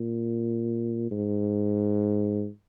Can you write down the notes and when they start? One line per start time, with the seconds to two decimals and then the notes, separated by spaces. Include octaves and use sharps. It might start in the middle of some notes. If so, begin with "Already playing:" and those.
Already playing: A#2
1.11 G#2